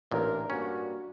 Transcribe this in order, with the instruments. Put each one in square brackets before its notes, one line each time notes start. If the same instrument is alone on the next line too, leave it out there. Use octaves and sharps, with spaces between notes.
[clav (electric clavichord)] A1 A#2 [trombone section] D4 A#4
[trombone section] G2 A#3 F#4 [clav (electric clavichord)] C#4